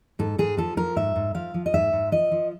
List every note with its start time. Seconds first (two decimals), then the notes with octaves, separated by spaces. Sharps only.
0.19 G#2 A4
0.38 G#2 G#4
0.57 F3 A4
0.77 F3 A#4
0.96 G#2 E5
1.16 G#2
1.35 F3 F5
1.54 F3
1.66 D#5
1.74 G#2 E5
1.93 G#2
2.12 F3 D#5
2.32 F3